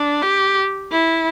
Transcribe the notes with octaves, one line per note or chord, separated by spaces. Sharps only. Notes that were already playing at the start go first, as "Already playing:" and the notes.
Already playing: D4
G4
E4